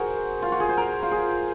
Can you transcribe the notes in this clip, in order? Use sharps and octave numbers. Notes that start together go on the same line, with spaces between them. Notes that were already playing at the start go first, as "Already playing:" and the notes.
Already playing: F#4 G#4 A#4 C5
F4
F#4
G#4
C5
A#4
F4
G#4